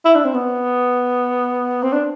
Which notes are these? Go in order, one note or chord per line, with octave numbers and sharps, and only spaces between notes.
E4
D4
C4
B3
C4
D4